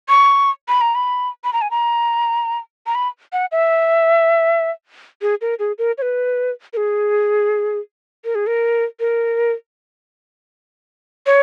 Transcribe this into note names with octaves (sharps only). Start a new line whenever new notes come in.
C#6
B5
A#5
B5
B5
A#5
G#5
A#5
A#5
B5
F#5
E5
G#4
A#4
G#4
A#4
C#5
B4
A#4
G#4
A#4
G#4
A#4
A#4
C#5